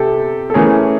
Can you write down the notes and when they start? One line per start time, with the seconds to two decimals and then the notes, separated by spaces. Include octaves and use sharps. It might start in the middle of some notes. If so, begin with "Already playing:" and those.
Already playing: C3 G4 A4
0.50 A4
0.54 E3 A3 C#4 G#4 A#4